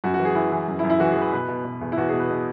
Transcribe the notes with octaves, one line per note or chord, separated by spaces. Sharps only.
F#2 F#4
F#4
E3
G#4
E3 E4
E3
F#2
E4
F#2
E4
E3 F#4
G#4
E3 B4
B2 B4
B2
B2
E2
E4
E2 F#4
B2 G#4
B4
B2